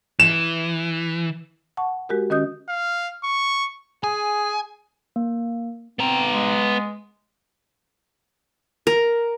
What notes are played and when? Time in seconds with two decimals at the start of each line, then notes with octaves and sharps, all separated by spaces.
0.20 E3 E7
1.77 F#5 A5 C#6
2.09 G#3 F#4 G4 A#4
2.30 D#3 C#4 F#4 D#5 D#6 G6
2.69 F5
3.24 C#6
4.04 G#4 G#5
5.16 A#3
5.99 B3 C4 A#5
6.31 G#3
8.87 A#4